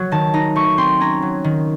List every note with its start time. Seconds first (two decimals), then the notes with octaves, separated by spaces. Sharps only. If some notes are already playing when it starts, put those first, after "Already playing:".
Already playing: F#3
0.12 D#3 A5
0.34 D#4 A#5
0.56 A3 C#6
0.78 C4 C6
1.00 C#4 A#5
1.22 F#3
1.44 D#3